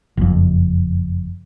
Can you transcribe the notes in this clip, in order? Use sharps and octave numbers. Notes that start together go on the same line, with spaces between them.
F#1 F2